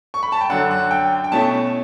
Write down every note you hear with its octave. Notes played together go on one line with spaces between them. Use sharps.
C#6
B5
A5
G5
F#2 D3 F#3 F#5
F#5
G5
G5
B2 A3 C#4 E4 A5